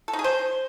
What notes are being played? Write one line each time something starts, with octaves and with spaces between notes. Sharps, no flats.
A4
D#4
G#4
C5